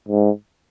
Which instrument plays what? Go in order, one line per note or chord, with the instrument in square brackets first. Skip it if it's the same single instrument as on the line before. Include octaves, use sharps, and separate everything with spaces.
[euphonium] G#2